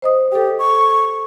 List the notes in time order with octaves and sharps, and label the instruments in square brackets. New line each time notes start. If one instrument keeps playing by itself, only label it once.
[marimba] C5 D#5 D#6
[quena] G4 [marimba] A4 G5
[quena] C#6